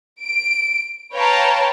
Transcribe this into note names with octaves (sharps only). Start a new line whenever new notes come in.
D7
B4 C#5 F5 G5 A5 A#5